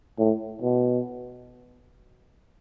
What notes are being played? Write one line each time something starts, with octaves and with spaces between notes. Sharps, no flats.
A2
B2